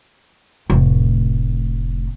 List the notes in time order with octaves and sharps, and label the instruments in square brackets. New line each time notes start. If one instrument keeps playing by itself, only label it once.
[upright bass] F1 A2